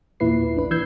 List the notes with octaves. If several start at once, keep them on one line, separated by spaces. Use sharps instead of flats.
E2 A#2 E4 B4 C7
A#1 D4 B4
E3 E6 G6 G#6 C7